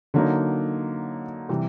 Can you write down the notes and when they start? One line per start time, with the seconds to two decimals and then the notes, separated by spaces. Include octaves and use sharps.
0.14 D3 F#3 A#3 D#4
1.49 C3 E3 G3